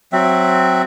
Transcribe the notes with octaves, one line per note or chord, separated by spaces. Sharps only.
F#3 C4 E5